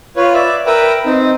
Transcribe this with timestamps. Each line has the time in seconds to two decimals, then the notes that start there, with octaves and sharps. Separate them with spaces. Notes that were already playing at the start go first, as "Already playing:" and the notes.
0.16 F4 B4 C#5
0.33 D5 E5
0.66 A#4 B4 E5 G5
1.05 C4 D#4